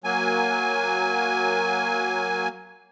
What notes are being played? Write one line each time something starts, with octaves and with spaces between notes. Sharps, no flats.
F#3 A#3 G#5